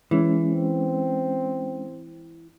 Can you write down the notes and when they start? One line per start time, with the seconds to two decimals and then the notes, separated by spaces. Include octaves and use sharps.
0.11 E3 G#3 C#4
0.50 C4